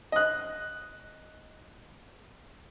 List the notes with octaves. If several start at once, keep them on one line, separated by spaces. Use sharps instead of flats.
D#5 F#6